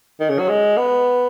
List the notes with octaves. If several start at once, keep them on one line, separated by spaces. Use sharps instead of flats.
D#3
C#3
F#3
G#3
B3